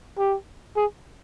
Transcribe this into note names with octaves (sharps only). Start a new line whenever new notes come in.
G4
G#4